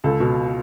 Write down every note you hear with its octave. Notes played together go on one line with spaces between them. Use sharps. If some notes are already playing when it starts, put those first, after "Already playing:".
C#2 A4
B2